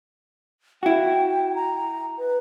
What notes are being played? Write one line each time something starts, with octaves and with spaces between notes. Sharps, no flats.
E4 F#4 G5
A#5
B4